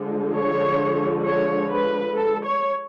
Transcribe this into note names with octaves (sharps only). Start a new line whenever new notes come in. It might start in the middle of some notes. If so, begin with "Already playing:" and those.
Already playing: D3 F3 G#3
C#5
C#5
B4
A4
C#5